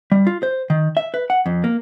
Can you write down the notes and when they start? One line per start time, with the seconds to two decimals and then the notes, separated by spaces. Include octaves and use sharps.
0.12 G3
0.27 F4
0.43 C5
0.70 D#3
0.97 E5
1.14 B4
1.30 F#5
1.46 F2
1.64 A#3